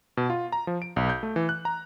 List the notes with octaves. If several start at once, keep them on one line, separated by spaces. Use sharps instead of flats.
B2
F4
A#5
F3
D7
B1
G6
A3
E3
F#6
A#5